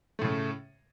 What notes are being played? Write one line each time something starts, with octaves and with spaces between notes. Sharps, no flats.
A2 C#3 A3